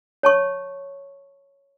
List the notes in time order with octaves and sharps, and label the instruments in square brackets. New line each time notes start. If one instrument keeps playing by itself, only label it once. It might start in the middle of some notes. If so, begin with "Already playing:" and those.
[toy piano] C#5 A5 C#6